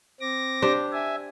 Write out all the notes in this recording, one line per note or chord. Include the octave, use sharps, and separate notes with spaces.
C4 D6 A#6
D4 G4 C5
E5 G#5